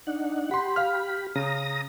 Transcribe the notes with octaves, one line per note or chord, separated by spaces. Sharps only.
D4 D#4 F#5
G4 F#5 B5 C6
F5 F6
C#3 A#5 D#6 A#6